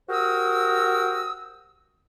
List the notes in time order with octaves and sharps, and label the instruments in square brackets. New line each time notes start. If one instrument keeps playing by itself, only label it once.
[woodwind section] F#4 G4 A#4 C5 D#6 E6